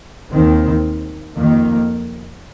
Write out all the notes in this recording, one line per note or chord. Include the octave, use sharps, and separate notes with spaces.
D#2 D#3 C4
F2 D#3 A#3